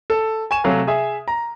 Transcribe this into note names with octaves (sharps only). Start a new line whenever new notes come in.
A4
G#5 C#6 E7
C3 F#3 A3 F5 G#5
G#4 E5
A#5